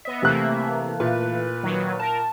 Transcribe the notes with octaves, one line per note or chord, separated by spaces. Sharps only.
B3 D#5 E5
C3 E3 A3 A#3 F#6
A#2 B4
D#3 F#3
A#4 A5